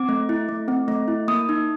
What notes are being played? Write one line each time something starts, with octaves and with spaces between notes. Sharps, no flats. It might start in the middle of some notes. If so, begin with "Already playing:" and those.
Already playing: C4 D6
A3
E4
A3
C4
A3
E4
A#3 D#6
D#4